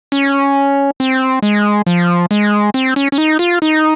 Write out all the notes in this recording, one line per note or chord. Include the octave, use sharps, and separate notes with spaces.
C#4
C4
G#3
F3
G#3
C4
C#4
C#4
D#4
F4
D#4